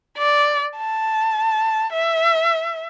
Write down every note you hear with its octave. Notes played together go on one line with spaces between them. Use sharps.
D5
A5
E5